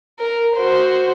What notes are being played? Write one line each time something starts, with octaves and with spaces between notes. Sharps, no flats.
A#4
F#4 C5